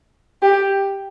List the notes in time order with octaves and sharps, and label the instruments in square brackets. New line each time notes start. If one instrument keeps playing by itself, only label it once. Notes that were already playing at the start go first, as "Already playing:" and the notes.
[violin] G4